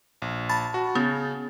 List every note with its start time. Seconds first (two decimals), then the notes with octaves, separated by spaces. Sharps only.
0.22 A#1
0.49 A5 B5 A6
0.74 F#4
0.95 C#3 B3